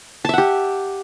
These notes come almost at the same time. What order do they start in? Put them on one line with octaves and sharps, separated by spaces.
A5 E5 F#5 G4